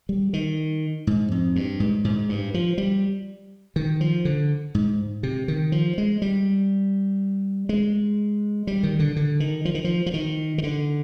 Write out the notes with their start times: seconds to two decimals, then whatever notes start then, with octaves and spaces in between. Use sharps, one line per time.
0.09 G3
0.33 D#3
1.07 G#2
1.32 F2
1.56 G2
1.80 G#2
2.04 G#2
2.29 G2
2.54 F3
2.78 G3
3.76 D#3
4.01 F3
4.25 D3
4.75 G#2
5.23 C3
5.48 D#3
5.72 F3
5.98 G#3
6.22 G3
7.69 G#3
8.67 G3
8.83 D#3
8.99 D3
9.16 D3
9.40 D#3
9.65 F3
9.75 D#3
9.84 F3
10.06 F3
10.14 D#3
10.58 D#3
10.63 D3